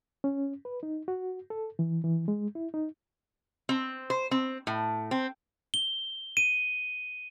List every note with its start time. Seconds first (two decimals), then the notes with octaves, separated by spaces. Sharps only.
0.24 C#4
0.65 B4
0.83 D#4
1.08 F#4
1.50 A4
1.79 E3
2.04 E3
2.28 G#3
2.55 E4
2.74 D#4
3.69 C4
4.10 C5
4.31 C4
4.67 A2
5.11 C4
5.74 G7
6.37 D#7